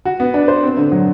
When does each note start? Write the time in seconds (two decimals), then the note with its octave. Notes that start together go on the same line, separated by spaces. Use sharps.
0.05 F#4
0.20 B3
0.34 D4
0.48 C5
0.63 C4
0.77 D3
0.92 F#3